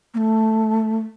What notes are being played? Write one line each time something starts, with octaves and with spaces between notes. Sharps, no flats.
A#3
A3